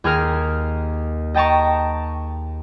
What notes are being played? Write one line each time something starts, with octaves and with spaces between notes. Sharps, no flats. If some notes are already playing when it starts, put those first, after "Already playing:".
D#2 G#4 A#4 F6
D#5 G5 A5 A#5 C#6